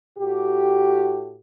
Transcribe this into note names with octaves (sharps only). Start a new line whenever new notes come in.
A2 F#4 G4